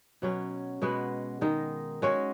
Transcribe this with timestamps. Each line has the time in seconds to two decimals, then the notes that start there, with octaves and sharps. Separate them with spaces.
0.22 B2 F#3 C#4
0.82 B2 G#3 B3 F#4
1.41 D#3 G#3 D#4
2.02 G#3 C#4 F#4 C#5